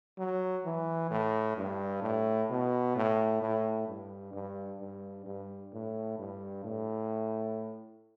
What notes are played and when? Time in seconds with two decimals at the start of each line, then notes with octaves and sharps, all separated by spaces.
0.18 F#3
0.65 E3
1.11 A2
1.57 G2
2.03 A2
2.50 B2
2.96 A2
3.41 A2
3.88 G2
4.33 G2
4.80 G2
5.26 G2
5.73 A2
6.18 G2
6.64 A2